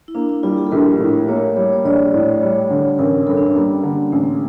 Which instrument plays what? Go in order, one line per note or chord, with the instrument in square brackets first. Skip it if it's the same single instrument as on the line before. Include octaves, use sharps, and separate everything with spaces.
[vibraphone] E4
[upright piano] A#3 [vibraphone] D4
[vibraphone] E4
[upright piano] G3 [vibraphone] F4
[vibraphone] G4
A4
[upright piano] A#1 [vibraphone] A#4
[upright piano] A2
[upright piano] A#3 [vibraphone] C#5
[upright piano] G3 [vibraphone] C#5
[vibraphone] C#5
[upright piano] A#1 [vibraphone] D5
[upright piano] A2
[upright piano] G3 [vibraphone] C#5
[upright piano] D3
[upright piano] A1 [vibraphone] A#4
[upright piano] G2 [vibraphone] A4
[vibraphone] D4
C#4
[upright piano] G3 [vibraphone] A#3
[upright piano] D3
[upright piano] A1 [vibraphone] A3